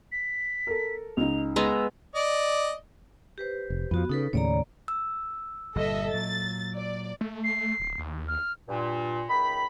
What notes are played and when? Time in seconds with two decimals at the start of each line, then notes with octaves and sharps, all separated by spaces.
0.12 B6
0.67 A4 A#4
1.17 C#2 D#4 F7
1.56 G#3 B3 A#5 E6
2.15 D5 D#5
3.38 G4 B4 C5
3.70 F1
3.91 F2 F3 B3 F#4
4.09 C#3 D#4 A4 B4
4.33 D#2 A2 C#3 C#5 D5 A#5
4.88 E6
5.76 G1 A#2 G3 A4 D#5 E5
6.14 A#2 F#3 A6
6.76 D5
7.21 A3
7.44 C7
7.80 D1
7.98 D#2
8.28 F6
8.68 G2 A#2
9.29 C#2 D#3 G5 B5